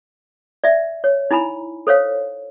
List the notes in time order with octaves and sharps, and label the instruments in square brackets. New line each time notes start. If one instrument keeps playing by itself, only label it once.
[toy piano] D5 E5
C#5
D#4 E4 G#5 A#5 B5
A4 C5 C#5 F5